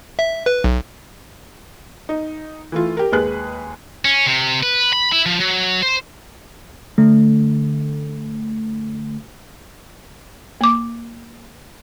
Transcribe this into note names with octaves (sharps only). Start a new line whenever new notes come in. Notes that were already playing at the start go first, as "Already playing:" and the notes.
E5
B4
B1
D#4
E3 A3 F4
G4 A#4
D#2 G#3 G#4 B4 F#6
C#4
C3
B4
B5
E4
F3
F#3
C5
D3 A3
A#3 D6